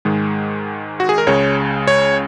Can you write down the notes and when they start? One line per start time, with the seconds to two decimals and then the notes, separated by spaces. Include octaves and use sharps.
0.05 G#2 D#3 G#3
1.00 F#4
1.09 G#4
1.18 A#4
1.27 C#2 C#3 G#3 C#5
1.88 C#5